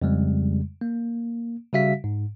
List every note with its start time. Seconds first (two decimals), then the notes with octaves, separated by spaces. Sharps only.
0.02 F2 C#3 G3 G#3
0.81 A#3
1.73 C#3 G3 F#4 E5 F5 B6
2.04 G#2